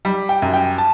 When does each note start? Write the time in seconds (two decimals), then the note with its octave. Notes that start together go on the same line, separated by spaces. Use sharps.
0.05 G3
0.29 G5
0.42 F#2
0.53 G5
0.78 A5